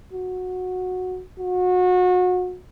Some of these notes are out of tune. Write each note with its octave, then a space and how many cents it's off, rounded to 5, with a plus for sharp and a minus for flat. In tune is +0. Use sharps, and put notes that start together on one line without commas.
F#4 -10
F#4 -30